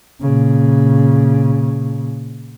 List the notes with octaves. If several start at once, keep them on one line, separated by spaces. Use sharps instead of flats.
A#2 C#3